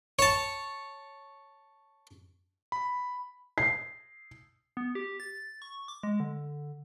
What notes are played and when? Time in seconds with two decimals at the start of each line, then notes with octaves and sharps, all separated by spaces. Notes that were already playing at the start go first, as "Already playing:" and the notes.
0.19 C#5 A5
2.72 B5
3.58 C7
4.77 B3
4.95 G4
5.20 A6
5.62 C#6
5.88 D6
6.03 G#3
6.20 D3